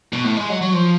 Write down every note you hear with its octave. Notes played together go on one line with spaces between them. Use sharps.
B2
A2
G#3
F#3
F#3
F3